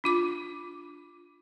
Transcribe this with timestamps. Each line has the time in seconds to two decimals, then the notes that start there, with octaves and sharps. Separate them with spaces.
0.04 D4 F4 D6